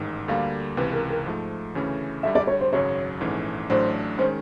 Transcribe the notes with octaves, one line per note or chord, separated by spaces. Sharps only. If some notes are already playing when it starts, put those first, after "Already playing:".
Already playing: A1 G#2 D#3
D2 D3 G3 A#3 F5
C#2 C3 E3 B4
A#4
A#4
G#2 F3 A3
D2 C#3 E3 A3 C#4
D2 D3 G3 E5
D5
C#5
C5
G#1 F#2 C#3 F#3 C#5
A#1 G#2 E3 A3 C#4
A1 A2 F#3 A3 D4 C5
D#3 G#3 C#4 C5